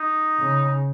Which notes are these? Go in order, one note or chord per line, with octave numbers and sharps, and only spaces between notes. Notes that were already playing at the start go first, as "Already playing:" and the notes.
Already playing: D#4
C#3